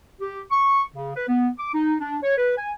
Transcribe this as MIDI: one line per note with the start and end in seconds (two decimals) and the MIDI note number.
0.20 0.41 67
0.51 0.82 85
0.94 1.11 49
1.16 1.28 71
1.28 1.48 59
1.58 1.70 86
1.74 1.95 63
2.00 2.17 62
2.23 2.34 73
2.37 2.55 71
2.57 2.71 80